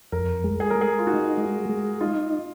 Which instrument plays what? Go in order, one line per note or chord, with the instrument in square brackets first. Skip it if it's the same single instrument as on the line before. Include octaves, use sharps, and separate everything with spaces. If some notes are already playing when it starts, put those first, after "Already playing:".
[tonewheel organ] F2 [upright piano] A#4
[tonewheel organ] G#3
[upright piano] G#4
[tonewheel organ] G#3 [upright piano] A#4
[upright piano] G#4
F4
[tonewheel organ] D#4 [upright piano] F#4
[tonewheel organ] G#3
G#3
[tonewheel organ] D#4 [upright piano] F4